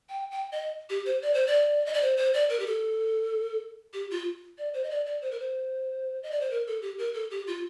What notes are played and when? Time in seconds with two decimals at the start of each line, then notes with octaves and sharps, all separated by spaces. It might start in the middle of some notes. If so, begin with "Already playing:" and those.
0.09 G5
0.31 G5
0.52 D#5
0.90 G4
1.06 C5
1.22 D5
1.34 C5
1.47 D5
1.86 D#5
1.94 D5
2.02 C5
2.17 C5
2.34 D5
2.50 A#4
2.59 G4
2.66 A4
3.93 G4
4.11 F4
4.58 D5
4.74 C5
4.84 D#5
4.90 D5
5.06 D5
5.22 C5
5.31 A#4
5.40 C5
6.23 D#5
6.31 D5
6.41 C5
6.51 A#4
6.67 A4
6.82 G4
6.98 A#4
7.14 A4
7.31 G4
7.47 F4